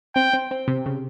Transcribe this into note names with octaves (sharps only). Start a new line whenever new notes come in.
C4 G5
C4
C4
C3
C#3